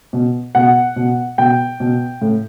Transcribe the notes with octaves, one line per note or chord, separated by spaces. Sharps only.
B2
B2 F#5
B2
B2 G5
B2
A2